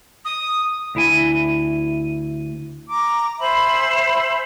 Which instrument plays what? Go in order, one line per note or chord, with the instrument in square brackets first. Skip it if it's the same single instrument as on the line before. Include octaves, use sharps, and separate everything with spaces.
[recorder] D#6
[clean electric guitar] D2 E4 G#5
[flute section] A#5 D6
C5 E5 G#5 B5